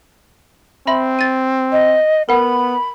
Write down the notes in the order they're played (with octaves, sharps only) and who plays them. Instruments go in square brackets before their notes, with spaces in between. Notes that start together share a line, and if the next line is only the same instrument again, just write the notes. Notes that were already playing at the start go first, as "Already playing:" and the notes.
[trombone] C4 [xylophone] E5 B5 C6
[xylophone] A6 D#7
[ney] D#5
[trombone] B3 [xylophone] A#4 F#5 [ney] B5